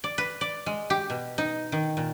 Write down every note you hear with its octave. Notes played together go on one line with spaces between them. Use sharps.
D5
B4
D5
G#3
G4
B2
D#4
D#3
A#2